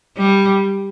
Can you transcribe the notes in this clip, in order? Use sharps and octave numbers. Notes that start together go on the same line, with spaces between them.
G3